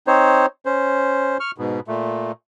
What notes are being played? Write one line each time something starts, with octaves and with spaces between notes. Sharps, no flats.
C4 D#4 C5 C#5
C#4 C5
C#6 F6
G#2 B2
A#2 A3